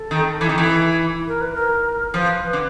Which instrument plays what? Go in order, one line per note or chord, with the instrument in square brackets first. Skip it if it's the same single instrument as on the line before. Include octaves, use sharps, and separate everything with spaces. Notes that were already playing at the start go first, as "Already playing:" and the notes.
Already playing: [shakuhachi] A4
[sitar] D#3
E3
D#3
E3
[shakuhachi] A#4
B4
A#4
[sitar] F3 [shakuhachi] B4
[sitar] D3